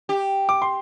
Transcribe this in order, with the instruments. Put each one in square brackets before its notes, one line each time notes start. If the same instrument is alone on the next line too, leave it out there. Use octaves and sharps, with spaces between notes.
[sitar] G4
[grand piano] D6
C6